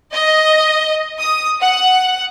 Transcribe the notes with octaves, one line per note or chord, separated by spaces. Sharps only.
D#5
D#6
F#5